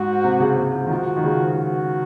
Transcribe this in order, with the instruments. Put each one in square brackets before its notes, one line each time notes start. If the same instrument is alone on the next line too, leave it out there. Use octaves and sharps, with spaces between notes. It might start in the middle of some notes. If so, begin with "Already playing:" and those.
Already playing: [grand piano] G#2 [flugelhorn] F#4
[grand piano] C3
C#3
C#3
F3
D#3
[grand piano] F3 [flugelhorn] F#4
[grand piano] F3
D#3
C#3
F3
[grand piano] F3 [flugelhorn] F#4